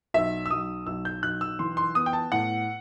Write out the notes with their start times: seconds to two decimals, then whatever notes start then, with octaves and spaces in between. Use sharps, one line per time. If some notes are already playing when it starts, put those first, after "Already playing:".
0.14 B1 E5
0.46 E6
0.51 B1 D#6
0.87 B1 E6
1.05 G6
1.23 B1 F#6
1.41 E6
1.59 E3 C6
1.77 C6
1.95 B3 D#6
2.06 G5
2.13 A5
2.32 A2 F#5